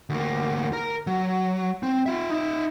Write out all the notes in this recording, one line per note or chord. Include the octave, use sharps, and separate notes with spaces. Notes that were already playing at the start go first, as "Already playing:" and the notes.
D2 A#3
A#4 A#5
F#3
C4
F4 E5
D#4 E5